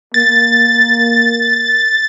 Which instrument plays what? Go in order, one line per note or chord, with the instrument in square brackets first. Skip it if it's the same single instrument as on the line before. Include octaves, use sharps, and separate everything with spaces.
[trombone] A#3 [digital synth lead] A6